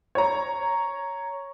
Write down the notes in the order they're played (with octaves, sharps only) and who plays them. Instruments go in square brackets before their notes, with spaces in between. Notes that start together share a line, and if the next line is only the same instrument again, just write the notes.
[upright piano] C#5 A#5